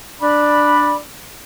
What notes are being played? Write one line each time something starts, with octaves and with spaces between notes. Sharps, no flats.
D4 D5 B5